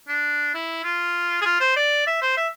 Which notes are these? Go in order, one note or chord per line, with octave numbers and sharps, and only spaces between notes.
D4
E4
F4
G#4
F4
C5
D5
E5
C5
E5